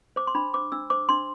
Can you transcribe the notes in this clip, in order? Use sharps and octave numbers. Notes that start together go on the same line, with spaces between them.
C5 D6
C6
D4 B5
C5 D6
D4 E6
C5 D6
D4 C6